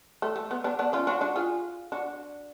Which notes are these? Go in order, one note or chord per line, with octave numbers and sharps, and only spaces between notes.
A3
A3
B3
B3 D4
B3 D4
C#4 F4
D4 F#4
D4 F#4
F4 G#4
D4 F#4